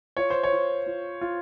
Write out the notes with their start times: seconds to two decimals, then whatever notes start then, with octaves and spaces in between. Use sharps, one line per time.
0.17 F4 C#5
0.30 C5
0.43 C#5
0.52 F4
0.87 F4
1.21 F4